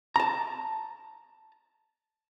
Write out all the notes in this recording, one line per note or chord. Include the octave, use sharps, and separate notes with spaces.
A5 A#5